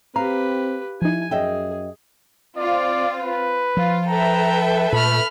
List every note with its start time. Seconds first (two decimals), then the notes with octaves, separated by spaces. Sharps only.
0.16 C4 G4 B4 F5 A#5
1.02 F3 D#4 E4 G#5
1.31 F#2 G#4 D#5 E5 G5
2.57 C4 F4 D5
3.20 B4
3.77 F3 F4
4.08 A4 B4 E5 G5 A#5
4.93 A#2 A3 B5 F6